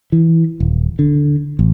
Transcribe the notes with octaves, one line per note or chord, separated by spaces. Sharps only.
E3
D#1
D3
A1